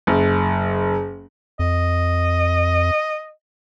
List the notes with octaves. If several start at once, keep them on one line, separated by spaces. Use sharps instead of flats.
F#1
F2 D#5